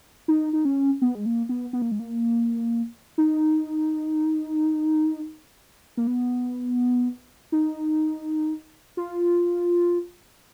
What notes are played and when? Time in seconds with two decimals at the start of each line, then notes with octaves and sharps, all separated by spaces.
0.28 D#4
0.53 D#4
0.65 C#4
1.02 B3
1.15 G#3
1.26 A#3
1.49 B3
1.73 B3
1.82 A#3
1.92 G#3
1.99 A#3
3.18 D#4
5.97 A#3
6.07 B3
7.52 D#4
8.97 F4